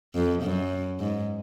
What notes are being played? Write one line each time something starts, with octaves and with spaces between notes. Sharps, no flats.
F2
F#2
G#2